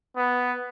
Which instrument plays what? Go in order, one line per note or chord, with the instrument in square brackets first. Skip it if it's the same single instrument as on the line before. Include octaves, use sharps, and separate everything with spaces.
[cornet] B3